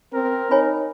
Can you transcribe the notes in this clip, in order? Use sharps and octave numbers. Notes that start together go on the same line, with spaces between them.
C4 A#4
D#4 C#5 G#5 B5